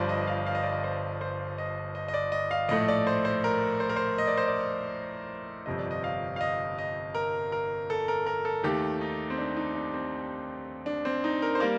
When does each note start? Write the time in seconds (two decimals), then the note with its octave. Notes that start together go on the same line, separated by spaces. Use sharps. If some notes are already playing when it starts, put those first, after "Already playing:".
Already playing: G1 G2 F3 C5 D5
0.09 D#5
0.27 F5
0.46 F5
0.55 D#5
0.63 D5
0.73 D#5
0.84 C5
1.21 C5
1.58 D#5
1.95 D#5
2.08 D#5
2.14 D5
2.32 D#5
2.51 F5
2.69 A#1 A2 A3 D#5
2.88 D5
3.07 C5
3.25 C5
3.44 A#4
3.80 C5
3.89 A#4
3.96 C5
4.18 D#5
4.27 D5
4.38 C5
4.48 D5
5.66 G1 F2 C3 D#5
5.79 D5
5.91 D#5
6.04 F5
6.36 F5
6.41 D#5
6.78 D#5
7.15 A#4
7.52 A#4
7.90 A4
8.08 A#4
8.27 A#4
8.45 A4
8.63 D#2 D#3 A3 G4
9.01 D#4
9.30 C4
9.38 D4
9.57 D#4
9.75 D4
9.94 C4
10.86 D4
11.05 C4
11.24 D#4
11.42 A#4
11.55 C5
11.60 G3 A#3 A#4